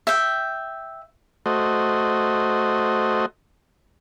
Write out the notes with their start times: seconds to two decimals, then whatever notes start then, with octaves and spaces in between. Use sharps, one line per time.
0.07 E5 G5
1.46 A3 F#4 C5 D#5